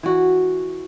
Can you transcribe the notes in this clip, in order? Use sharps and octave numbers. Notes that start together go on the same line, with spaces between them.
E3 F#4